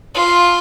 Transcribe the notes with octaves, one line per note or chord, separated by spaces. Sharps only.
F4